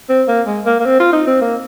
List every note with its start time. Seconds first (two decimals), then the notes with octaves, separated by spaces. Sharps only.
0.09 C4
0.28 A#3
0.47 G#3
0.66 A#3
0.79 A#3
0.85 C4
1.00 F4
1.13 D#4
1.27 C4
1.41 A#3